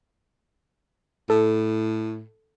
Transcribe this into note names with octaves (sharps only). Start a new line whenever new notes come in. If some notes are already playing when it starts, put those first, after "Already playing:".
A2 A4